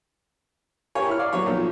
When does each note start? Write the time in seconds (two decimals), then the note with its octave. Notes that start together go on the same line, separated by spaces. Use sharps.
0.95 G4 A#4 C#5 G#5
1.07 E4 F6
1.19 D5 F5
1.33 F#3 A#3 C#5
1.46 B1 F3